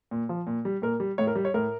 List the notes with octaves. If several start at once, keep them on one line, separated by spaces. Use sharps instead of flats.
A#2
F3
A#2
G3
A#2 A#4
G3
A2 C#5
A#4
G3
C#5
A2 A#4